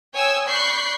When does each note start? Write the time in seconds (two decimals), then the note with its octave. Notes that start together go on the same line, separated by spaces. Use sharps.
0.14 C#5 G5 G#5 D#6 E6
0.48 D5 B5 C#6 F#6 G6 C7